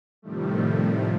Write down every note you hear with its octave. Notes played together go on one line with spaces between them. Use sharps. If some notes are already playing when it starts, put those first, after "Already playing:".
A2 C3 D#3 F3 G3 A3